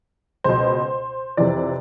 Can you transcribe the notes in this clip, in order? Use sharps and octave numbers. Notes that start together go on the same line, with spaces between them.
C#2 B2 C5
F2 C3 E3 D5